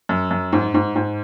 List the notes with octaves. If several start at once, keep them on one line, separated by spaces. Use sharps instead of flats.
F#2
F#2
G#2
G#2
G#2